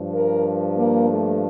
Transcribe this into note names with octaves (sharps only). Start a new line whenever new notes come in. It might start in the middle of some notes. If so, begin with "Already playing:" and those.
Already playing: G2 F3
A#4
A#3
A3